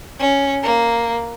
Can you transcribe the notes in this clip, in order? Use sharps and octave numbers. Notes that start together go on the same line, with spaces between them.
C#4
A#3